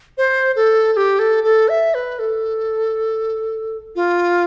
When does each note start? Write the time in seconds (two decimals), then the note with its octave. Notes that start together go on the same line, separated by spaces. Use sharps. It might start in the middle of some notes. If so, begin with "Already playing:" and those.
0.18 C5
0.56 A4
0.93 A4
0.97 G4
1.19 A4
1.44 A4
1.69 E5
1.94 B4
2.19 A4
3.96 F4